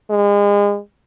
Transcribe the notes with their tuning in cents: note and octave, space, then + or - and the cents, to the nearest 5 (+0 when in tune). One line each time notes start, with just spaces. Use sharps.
G#3 -35